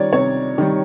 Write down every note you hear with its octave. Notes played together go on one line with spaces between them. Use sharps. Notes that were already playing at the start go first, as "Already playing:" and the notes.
Already playing: D#3 G3 C#5 D5
C3 C#5
D#3 G3